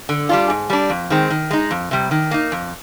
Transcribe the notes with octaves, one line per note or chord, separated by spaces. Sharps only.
D3
G3 D4 F4
G#2
G3 D4
F2
D#3 G#3 C4
D#3
G#3 D#4
F2
C3 G3
D#3
A#3 D#4
F2